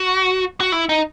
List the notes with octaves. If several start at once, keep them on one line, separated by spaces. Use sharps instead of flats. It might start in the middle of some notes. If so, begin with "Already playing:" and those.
Already playing: F#4
F#4
E4
D#4